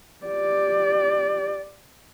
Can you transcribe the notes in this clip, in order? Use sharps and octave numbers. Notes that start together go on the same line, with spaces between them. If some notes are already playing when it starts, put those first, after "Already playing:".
G4 D5